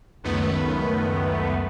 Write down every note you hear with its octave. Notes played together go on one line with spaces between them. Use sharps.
C#2 F#2 D#3 A3 B3